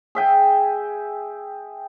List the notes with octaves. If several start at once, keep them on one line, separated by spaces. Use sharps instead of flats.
G#4 E5 G5 G#5